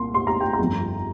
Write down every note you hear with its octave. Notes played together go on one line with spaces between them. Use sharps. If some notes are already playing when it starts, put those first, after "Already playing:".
Already playing: C2 A#2 A#3 C6
C6
A#5
G5
A#5
G1 F2 F3